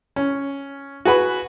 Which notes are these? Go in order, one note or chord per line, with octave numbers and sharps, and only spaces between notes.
C#4
F#4 G#4 B4 B5